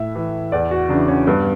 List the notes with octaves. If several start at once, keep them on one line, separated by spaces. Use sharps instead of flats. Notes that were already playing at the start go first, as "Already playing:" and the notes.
Already playing: A2 E5
E3
E2 D5
F#4
C#3 E3 D4
C#4
G2 B3